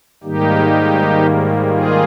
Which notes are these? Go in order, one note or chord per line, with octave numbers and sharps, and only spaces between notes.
G#2 D#3 G3 A#3 D#4 G4
F4 G#4